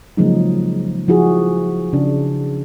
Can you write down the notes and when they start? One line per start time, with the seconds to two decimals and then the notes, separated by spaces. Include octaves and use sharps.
0.17 C#3 F3 F#3 G#3 A#3 D#4
1.08 F3 E4 F#4 G#4
1.93 C#3 D4